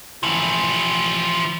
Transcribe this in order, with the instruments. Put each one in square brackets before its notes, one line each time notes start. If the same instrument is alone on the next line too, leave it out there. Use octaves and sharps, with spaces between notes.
[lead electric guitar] E3 F3